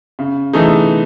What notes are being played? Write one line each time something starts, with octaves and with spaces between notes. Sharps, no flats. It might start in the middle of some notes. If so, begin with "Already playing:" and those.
C#3
E3 A3 D#4 G#4